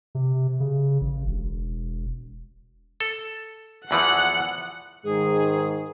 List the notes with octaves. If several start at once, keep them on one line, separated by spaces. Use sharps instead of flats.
C3
C#3
A1
E1
A4
E2 E3 F3 F#5
G#2 D#3 G#4